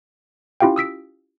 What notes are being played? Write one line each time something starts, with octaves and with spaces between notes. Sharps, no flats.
C#4 E4 F4 G4 F5 G5
D#6 E6 B6 D7